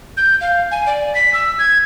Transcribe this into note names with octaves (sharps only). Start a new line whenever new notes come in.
G6
F5
G#5
D5
B6
E6
G#6